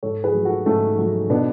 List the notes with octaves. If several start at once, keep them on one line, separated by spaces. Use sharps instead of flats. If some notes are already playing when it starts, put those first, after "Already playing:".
G#2 A4 C#5
G#4 B4
F#3 A3
F#4 A4
G#2 A3 C#4
F#3 A3
B2 B3 D4